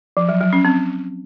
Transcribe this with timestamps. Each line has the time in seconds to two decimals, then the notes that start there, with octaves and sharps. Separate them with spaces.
0.17 F3
0.29 F#3
0.41 F#3
0.53 C#4
0.65 C4